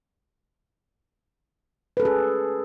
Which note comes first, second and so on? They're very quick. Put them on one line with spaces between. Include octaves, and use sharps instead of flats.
B4 A4 C#4 G#4